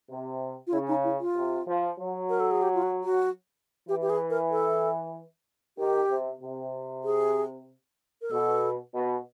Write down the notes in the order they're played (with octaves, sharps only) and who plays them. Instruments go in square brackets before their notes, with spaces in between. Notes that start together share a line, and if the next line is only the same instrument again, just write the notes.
[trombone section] C3
[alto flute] F4
[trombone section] C#3 [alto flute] E4
[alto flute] D#4
E4
F4
[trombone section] C3
F3
F#3
[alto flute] A#4
A4
G#4
G4
F4
F#4
F#4
[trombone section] E3 [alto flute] G4
[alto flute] G4
G#4
A#4
A4
[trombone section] D#3 [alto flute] G4
[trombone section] C3
C3
[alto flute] G#4
A#4
[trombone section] B2 [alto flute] A4
[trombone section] B2